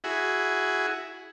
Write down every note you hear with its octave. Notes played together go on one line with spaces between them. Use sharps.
E4 F#4 G#4